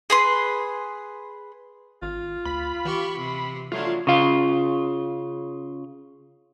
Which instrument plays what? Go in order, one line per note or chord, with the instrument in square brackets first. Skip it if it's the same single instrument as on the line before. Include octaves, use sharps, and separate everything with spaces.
[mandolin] G#4 B4 C6
[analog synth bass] G#1 [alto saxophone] F4
[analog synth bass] D2 [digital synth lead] B5
[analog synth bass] E3 [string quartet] G4 C#6
[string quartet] C3
[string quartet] F3 F#3 D4 [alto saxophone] A3 [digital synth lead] F4
[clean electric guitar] C#3 F4